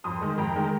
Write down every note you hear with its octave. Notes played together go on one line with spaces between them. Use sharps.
F2 C6 D#6
D#3 G#3
F2 G5 A#5
D#3 G#3